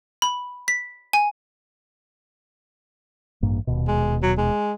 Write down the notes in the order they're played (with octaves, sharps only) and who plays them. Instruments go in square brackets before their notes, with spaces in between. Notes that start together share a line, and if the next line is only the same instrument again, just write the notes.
[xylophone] B5
B6
G#5
[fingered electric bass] A1 G2 A#3
D#1 D#2 B2
[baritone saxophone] G#3
F#3
G#3